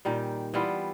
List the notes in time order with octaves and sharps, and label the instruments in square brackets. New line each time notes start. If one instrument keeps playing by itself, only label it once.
[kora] A#2 D#3 G3
E3 G3 B3 F4